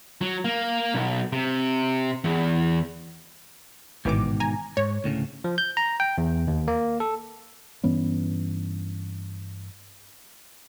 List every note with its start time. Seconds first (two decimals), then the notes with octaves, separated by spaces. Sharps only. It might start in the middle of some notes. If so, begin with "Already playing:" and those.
0.21 F#3
0.44 A#3
0.94 B1
1.33 C3
2.24 E2
4.05 A1 G#2 B2 D#3 E3 D6
4.40 G#5 A#5
4.77 G#2 C#5
5.04 D2 A2 C#3
5.44 F3
5.58 G6
5.77 A#5
6.00 G5
6.18 E2
6.47 D#2
6.68 A#3
7.00 A4
7.84 G2 E3 B3 C#4